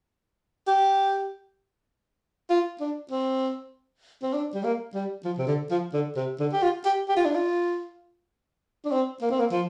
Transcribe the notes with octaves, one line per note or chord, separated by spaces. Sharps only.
G4
F4
D4
C4
C4
D4
G3
A#3
G3
F3
C3
D3
F3
D3
C3
D3
G4
F4
G4
G4
F4
D4
F4
D4
C4
A#3
C4
A#3
F3